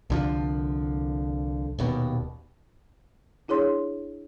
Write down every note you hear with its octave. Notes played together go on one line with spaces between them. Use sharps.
C2 D3 F3
D#1 D#2 B2
D4 E4 G#4 C#5 C6